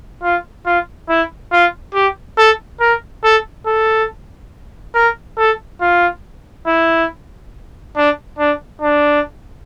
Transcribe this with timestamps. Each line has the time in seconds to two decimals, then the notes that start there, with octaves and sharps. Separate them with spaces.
0.23 F4
0.66 F4
1.09 E4
1.52 F4
1.94 G4
2.38 A4
2.80 A#4
3.24 A4
3.66 A4
4.95 A#4
5.38 A4
5.81 F4
6.67 E4
7.96 D4
8.39 D4
8.81 D4